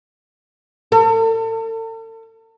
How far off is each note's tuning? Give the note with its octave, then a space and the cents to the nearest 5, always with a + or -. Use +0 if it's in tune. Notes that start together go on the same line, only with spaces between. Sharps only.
A4 +40